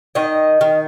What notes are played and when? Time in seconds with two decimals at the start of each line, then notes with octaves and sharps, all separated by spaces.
0.15 D#3 D#5
0.61 D#3